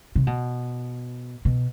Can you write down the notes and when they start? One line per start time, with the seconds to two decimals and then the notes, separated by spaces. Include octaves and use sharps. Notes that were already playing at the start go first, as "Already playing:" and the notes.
0.15 C3
0.27 B2
1.45 B2